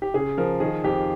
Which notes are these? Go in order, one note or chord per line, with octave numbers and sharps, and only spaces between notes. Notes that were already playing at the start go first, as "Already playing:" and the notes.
G4
C#3 G#4
F3 A#4
D#3 G#4
F2 G4